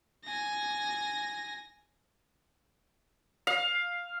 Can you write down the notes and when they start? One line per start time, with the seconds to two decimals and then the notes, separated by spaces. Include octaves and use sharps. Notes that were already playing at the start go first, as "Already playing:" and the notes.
0.25 G#5 A#6
3.47 F5